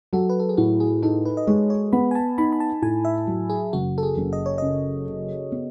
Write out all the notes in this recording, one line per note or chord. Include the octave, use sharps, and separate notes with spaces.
F#3 A4
B4
A4
G#4
A2 F#4
G#4
D#4 A4
B4
D#5
G#3 C#5
C#5
B3 B5
G#5
A5
D#4 B5
B5
A5
A2 G#5
E5
F#3
G#4
F#1 F#4
A4
G#4
F#1
D#5
C#5
C#3 D#5
C#3
B3